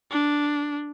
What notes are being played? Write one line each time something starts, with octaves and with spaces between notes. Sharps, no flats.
D4